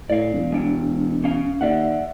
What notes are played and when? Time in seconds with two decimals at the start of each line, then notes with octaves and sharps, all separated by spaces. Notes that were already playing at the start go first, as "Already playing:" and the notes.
0.10 A2 D5 F5
0.33 E1
0.52 G#3 D4
1.24 C#4 F5
1.61 D#2 D5 E5 F#5